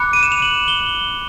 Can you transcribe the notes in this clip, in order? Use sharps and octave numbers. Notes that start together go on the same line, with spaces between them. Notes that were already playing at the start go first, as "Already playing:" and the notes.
Already playing: B5 D6 F#6 C#7
D#7
E7
F7
F#7
G7